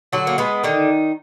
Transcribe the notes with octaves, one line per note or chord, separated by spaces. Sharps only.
D3 F#3 F#4
A#3
G#3 B3
D3 D#3 D#4